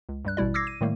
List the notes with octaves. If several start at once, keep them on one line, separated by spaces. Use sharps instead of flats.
C#2
G2 G3 F#6
A1 B2 G3 E4 D5
D6 E6 G#6 A#6 C7
D#7
A2 D#3 G3 A3 A#3